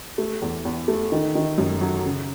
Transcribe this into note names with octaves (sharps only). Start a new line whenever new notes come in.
A3
E2
E2
A3
D#3
D#3
F#2
F#3
C#3